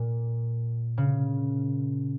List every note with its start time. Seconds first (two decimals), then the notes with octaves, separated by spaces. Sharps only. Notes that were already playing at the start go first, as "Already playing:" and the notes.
Already playing: A#2
0.98 C#3